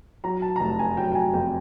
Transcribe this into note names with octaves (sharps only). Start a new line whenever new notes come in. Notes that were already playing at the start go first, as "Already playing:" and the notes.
F#3 A#5
A5
A#5
F1 A5
G#5
F#3 G5
G5
G#5
F2 G5